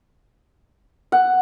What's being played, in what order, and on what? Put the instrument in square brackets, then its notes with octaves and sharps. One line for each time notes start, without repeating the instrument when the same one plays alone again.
[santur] F#5